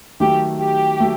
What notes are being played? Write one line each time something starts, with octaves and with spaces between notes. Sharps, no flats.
D#3 F#3 A3 G4
G4
F#3 A3